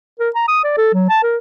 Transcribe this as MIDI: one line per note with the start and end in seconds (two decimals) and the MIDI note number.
0.20 0.30 70
0.35 0.48 82
0.48 0.60 87
0.64 0.73 74
0.77 0.91 69
0.93 1.05 54
1.09 1.20 81
1.23 1.37 70